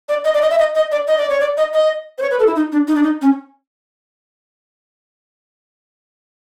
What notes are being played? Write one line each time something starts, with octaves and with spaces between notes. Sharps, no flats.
D5
D#5
D5
D#5
E5
D#5
D#5
D5
D#5
D5
C#5
D5
D#5
D#5
C5
C#5
B4
A4
E4
D#4
D4
D#4
D4
D#4
C#4